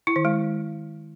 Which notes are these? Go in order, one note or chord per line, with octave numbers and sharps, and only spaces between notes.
E4
D#3
G#3